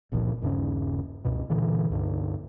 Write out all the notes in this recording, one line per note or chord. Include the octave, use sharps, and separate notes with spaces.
G1 C#2 A#2 F3
D#1 G2 C#3 C#4
C#2 F#2 B2
A#2 D3 E3
C#2 G2 D3